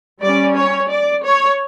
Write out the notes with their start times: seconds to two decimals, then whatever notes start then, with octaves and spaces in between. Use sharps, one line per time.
0.21 G3 C#4 D5
0.55 C#5
0.88 D5
1.23 C#5